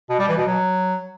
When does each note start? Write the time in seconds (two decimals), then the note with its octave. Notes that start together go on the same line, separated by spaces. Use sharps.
0.09 B2
0.19 G3
0.28 E3
0.37 B2
0.47 F#3